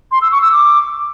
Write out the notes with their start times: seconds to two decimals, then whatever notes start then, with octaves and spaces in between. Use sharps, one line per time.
0.11 C6
0.22 E6
0.32 C#6
0.42 E6
0.52 D6